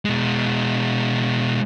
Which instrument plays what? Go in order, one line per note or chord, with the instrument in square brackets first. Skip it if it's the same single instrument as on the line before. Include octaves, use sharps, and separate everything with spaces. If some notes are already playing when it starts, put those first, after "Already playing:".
[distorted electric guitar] B2 G#3